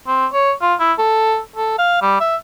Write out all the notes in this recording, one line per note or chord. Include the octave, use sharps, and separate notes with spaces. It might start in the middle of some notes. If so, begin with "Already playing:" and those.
C4
C#5
F4
E4
A4
A4
F5
G3
E5